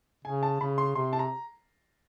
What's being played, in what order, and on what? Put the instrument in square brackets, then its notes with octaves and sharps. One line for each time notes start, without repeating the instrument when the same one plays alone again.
[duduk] C#3 [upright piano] G#5
[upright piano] A5
[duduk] C#3 [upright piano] B5
[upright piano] C6
[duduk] C3 [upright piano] C6
[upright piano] A5
A#5